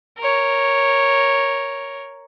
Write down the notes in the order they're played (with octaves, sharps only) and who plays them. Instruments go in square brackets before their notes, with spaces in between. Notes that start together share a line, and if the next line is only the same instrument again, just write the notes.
[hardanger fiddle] A#4 C#5